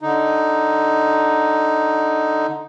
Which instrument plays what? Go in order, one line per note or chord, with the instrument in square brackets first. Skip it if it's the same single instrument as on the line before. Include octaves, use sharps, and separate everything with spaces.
[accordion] D3 D#4